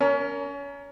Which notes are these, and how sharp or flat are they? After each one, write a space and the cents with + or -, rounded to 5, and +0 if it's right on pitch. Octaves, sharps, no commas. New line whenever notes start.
C#4 +30 A#4 +0